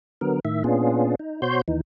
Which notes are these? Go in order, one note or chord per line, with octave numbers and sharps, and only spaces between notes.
D3 F#3 B3 A#4
A2 D#3 E5
A#2 B3 C#4 D4 F4 G#4
D#4
B2 F#4 C5 C#5 C6 G6
D#2 E3 D#4